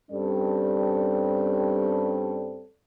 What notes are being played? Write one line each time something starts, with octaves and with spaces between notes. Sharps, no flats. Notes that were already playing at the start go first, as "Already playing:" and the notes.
G2 G3 C4 C#4 A4 D5